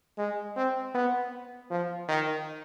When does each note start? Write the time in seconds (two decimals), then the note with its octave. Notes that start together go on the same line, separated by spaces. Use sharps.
0.18 G#3
0.56 C4
0.95 B3
1.71 F3
2.09 D#3